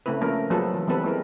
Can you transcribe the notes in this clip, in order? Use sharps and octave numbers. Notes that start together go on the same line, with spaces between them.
C#3 A3 C4 E4 B4
F3 A3 A#3 C#4 A#4
F3 F#3 A#3 G#4 A4 B4
E3
E3 G3 B3 C4 A4 B4
G#3 E4 A#4